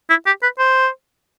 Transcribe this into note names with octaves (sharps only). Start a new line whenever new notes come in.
E4
G4
B4
C5